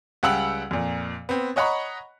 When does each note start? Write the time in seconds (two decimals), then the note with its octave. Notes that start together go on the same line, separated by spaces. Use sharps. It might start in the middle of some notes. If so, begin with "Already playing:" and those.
0.23 C#2 G3 F#5 G5 E6 F#7
0.71 F2 A#2
1.29 B3 C4
1.56 C#5 D#5 F#5 A#5 B5 C#6